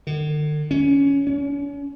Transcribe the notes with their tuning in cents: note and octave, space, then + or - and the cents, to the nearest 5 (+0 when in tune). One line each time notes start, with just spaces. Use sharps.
D3 +40
C#4 +15
C#4 +40